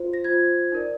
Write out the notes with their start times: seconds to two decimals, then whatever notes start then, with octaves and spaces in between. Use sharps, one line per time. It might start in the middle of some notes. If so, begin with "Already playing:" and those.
Already playing: F4 C5
0.14 A#6
0.24 F4 C5 G#6
0.72 D#4 A#4 D5